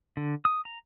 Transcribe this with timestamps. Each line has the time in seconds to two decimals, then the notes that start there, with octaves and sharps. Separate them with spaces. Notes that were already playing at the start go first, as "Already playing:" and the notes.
0.17 D3
0.45 D#6
0.65 A#5